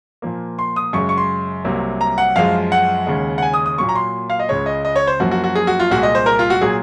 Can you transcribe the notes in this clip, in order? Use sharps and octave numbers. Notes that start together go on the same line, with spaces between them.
A#2 F3 A#3
C6
D#6
F#2 C#3 G#3 C#6
C#6
C6
C2 C3 F#3 A#3
A#5
F#5
F#2 F3 G#3 F5
F#5
D#2 C#3 G#3
F#5
G#5
D#6
D#6
A#2 F#3 A#3 C#6
A#5
C6
F5
D#5
C#2 C#3 G#3 C#5
D#5
D#5
C#5
C5
F#2 F3 A#3 F#4
F#4
F#4
G#4
F#4
F4
C2 A#2 G#3 F#4
D#5
C5
A#4
F4
F#4
A#2 F#3 A#3 G#4